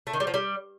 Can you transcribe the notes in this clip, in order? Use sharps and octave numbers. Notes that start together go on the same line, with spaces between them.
A3
D#3
G3
F3
G3